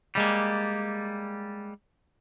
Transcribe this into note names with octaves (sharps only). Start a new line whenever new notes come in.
G3 G#3 A#3